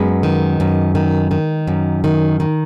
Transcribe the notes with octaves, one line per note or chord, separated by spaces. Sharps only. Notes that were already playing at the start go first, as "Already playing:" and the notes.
Already playing: F#2 G#3 B3
D#3
F#2
D#3
D#3
F#2
D#3
D#3